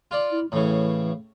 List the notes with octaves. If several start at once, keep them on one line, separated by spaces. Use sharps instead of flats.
F4 D5
E4
A2 C#3 E3